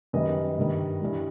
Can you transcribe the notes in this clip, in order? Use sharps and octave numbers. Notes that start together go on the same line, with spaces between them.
F#2 D#3 G3 B4 D#5
G2 D#3 G3
G2 E3 G3